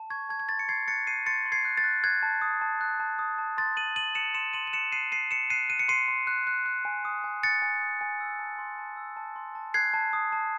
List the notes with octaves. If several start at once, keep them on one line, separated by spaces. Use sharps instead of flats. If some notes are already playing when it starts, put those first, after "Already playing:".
Already playing: A5
C#6 G#6
A5 G#6
G#6
C6 A6
C#7
C6 G#6 C7
F#6 A6 C#7
F#6 C7 D#7
C6 A6 C#7
C6
G#6 C7
F#6
A6
F#6
F#6 G#6
A5
D#6
A5
F#6
A5
D#6
A5
C6 A6
C6 D#7 F#7
F#6 D#7 F#7
F#6 C#7 E7
C6 C#7 E7
C6 D#7 F#7
D#7
F#6 C#7 E7
F#6 C7 D#7
C6 C7 D#7
C6 C#7 E7
F#6 C7 D#7
F#6 D#7
C#7
C6 C7 D#7
C6
F#6
F#6
F#6
G#5
D#6
G#5
F#6 A6 C#7
G#5
D#6
G#5
E6
A5
C6
A5
E6
A5
C6
A5
F#6 G#6 C7
A5
D#6
A5